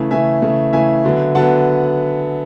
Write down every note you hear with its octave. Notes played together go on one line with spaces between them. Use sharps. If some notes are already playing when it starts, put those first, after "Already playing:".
Already playing: C#3 E3 A3
C#3 E3 A3 E5 G#5
C#3 E3 A3
C#3 E3 A3 E5 G#5
D3 F#3 B3
D3 F#3 B3 F#5 A5